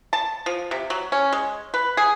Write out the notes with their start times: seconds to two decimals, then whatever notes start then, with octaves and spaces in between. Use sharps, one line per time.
0.13 A5
0.46 F3
0.71 C3
0.90 F#3
1.12 C#4
1.32 G#3
1.74 B4
1.97 G#4